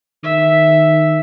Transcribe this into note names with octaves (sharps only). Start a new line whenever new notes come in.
D#3 E5